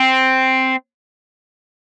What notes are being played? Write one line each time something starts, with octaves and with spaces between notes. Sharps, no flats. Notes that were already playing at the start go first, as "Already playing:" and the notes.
Already playing: C4